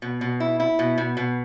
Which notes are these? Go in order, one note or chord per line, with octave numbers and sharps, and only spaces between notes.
B2
B2
E4
E4
B2
B2
B2